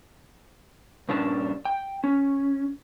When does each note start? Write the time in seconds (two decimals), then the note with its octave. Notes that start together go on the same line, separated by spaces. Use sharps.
1.09 G2 A#2 C#4 D4 A5
1.65 G5
2.04 C#4